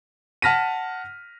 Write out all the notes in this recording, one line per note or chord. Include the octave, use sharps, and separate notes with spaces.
F#5 A5 F6 A#6 B6 D#7